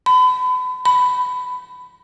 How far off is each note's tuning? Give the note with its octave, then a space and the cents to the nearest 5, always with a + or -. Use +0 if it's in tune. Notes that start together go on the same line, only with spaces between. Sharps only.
B5 +35
B5 +15